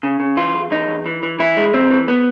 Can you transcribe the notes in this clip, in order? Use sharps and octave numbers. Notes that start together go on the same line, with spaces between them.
C#3
C#3
E3 F4
E2
E2 D#4
E2
E3
E3
E3 E4
G#3
E2 C4
E3
B3